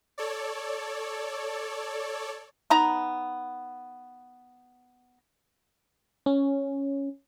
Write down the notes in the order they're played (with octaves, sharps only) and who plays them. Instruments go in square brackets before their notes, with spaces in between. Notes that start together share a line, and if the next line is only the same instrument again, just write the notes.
[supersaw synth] A4 C#5 D5
[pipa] B3 D#4 A#5
[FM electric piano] C#4